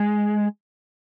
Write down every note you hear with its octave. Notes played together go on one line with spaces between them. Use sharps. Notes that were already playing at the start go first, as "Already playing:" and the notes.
Already playing: G#3